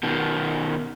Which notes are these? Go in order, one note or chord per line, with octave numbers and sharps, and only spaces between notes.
B2 D#3